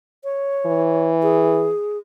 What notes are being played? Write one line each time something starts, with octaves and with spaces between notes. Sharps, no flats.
C#5
E3
G#4